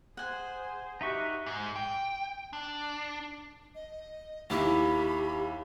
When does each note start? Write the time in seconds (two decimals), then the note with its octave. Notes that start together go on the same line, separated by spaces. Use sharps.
0.17 G#4 C5 F#5 G#5
1.01 D#4 F#4 G4 B4 E5 C#6
1.46 G#2
1.76 G5
2.53 D4
3.75 D#5
4.50 D#2 E4 G4 B5 D6